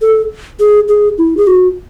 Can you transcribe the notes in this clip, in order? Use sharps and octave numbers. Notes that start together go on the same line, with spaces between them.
A4
G#4
G#4
E4
G#4
F#4